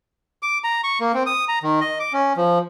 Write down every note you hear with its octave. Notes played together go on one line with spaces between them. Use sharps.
D6
A#5
C#6
A#3
C4
D#6
A#5
D#3
D#5
D6
C#4
F3